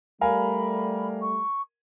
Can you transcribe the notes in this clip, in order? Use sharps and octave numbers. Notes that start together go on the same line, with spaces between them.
G3 A3 A#4 F5 G#5 B5
C#6